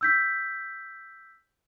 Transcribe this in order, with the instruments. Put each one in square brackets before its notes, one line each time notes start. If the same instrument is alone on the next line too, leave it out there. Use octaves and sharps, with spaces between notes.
[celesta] E6 G6 B6